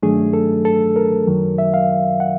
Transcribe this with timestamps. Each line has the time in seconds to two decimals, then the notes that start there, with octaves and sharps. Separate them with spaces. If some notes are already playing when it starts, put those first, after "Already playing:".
0.03 G2 D#3 F#3 A3 D4 G#4
0.33 A4
0.65 A4
0.96 A#4
1.27 F#2 D#3 F#3
1.58 E5
1.74 F5
2.20 F#5